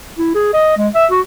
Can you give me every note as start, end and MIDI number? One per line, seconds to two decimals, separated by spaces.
0.18 0.30 64
0.35 0.52 68
0.53 0.74 75
0.77 0.88 56
0.95 1.06 76
1.11 1.21 66